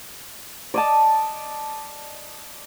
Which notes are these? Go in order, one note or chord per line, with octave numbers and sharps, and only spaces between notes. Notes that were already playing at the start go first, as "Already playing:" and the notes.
D5 D#5 A5